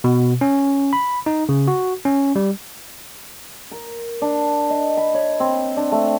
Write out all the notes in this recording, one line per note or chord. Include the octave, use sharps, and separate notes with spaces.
B2
C#4
B5
D#4
C#3
F#4
C#4
G3
A#4
D4
D#5
B5
C#5
C4
D4
A3